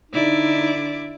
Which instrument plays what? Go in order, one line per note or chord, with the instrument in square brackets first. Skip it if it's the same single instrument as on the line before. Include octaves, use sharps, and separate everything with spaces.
[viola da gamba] D3 E4 D5 [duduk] D#4